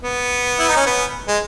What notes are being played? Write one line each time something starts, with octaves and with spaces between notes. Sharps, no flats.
B3
E4
D#4
C#4
B3
G#3